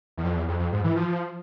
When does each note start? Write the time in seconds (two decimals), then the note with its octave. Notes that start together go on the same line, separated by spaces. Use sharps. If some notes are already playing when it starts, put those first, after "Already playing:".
0.17 E2
0.24 F2
0.35 E2
0.48 F2
0.59 F2
0.72 G#2
0.84 E3
0.96 F3